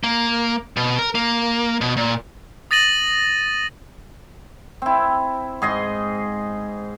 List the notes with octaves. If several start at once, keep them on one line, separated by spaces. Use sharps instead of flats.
A#3
B2
A#4
A#3
B2
A#2
D#6 A6 A#6 D#7 F#7
C4 E4
G#2 G#4 D#5 C6